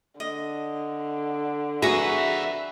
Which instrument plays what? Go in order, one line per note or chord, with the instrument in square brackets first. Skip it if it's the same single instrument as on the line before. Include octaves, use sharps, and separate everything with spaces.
[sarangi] D3 [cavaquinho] D#5
[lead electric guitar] F2 E5 [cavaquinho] F#4 B4 A#5 [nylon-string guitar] G#4